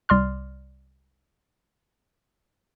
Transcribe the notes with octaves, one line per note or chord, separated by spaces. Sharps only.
C2 D5 C6 F6